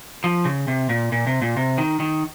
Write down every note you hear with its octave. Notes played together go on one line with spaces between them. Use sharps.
F3
C#3
C3
A#2
A#2
C3
A#2
C3
D#3
D#3